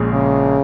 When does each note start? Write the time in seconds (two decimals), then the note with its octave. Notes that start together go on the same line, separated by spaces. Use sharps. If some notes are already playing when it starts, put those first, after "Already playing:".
Already playing: A#1 A#2 G#3 C#4 G#4
0.12 C#3